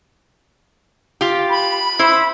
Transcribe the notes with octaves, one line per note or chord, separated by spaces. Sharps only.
F4 G4
B5
E4 C5